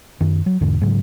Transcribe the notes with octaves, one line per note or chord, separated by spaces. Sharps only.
F#2 D#3
F#3
E2 G#2 D3
G#2 C#3 F#3